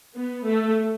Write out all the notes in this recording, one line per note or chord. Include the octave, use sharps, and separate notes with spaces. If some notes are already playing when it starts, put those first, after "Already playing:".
B3
A3